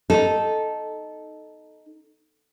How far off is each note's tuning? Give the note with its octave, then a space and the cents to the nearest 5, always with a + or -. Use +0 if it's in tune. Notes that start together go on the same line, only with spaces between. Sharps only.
D#4 -5 A4 -10